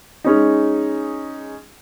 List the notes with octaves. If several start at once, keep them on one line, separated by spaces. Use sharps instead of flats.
G#3 C#4 D#4